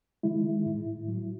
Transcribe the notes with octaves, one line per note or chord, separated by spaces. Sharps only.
D#3 G#3 E4
A2
F#3